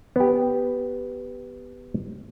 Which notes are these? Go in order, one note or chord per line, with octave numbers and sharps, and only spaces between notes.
B3 G4